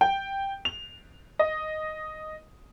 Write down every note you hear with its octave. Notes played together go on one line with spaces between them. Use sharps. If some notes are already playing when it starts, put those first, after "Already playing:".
G5
F7
D#5